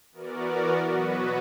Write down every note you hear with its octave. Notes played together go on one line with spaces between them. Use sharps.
E3 B3 F#4 A#4 D5
B2 F#3 B3 F#4 B4